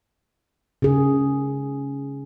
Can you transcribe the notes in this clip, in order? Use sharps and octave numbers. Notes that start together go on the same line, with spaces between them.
C#3 G#4